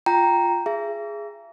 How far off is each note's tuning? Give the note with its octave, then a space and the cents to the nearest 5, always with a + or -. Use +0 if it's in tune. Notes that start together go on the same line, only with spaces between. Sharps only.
F4 +0 G5 +0 A#5 +0
G#4 +0 E5 +40